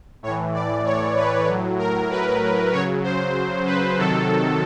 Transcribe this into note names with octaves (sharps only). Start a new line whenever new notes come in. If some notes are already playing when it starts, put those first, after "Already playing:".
A2 E3 C#5
D5
C#5
B4
A2 F#3
A#4
B4
C#3 F#3 C#5
C5
B4
C3 D#3 F#3 A4